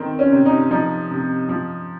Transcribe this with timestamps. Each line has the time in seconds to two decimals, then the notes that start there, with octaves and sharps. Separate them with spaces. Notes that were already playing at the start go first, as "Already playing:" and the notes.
Already playing: D#3 C4
0.19 C#4
0.32 C3
0.46 D#4
0.71 F3 D#4
1.11 C3
1.49 F3